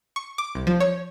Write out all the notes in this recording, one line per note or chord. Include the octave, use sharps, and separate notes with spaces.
C#6
D6
C2
F3
C#5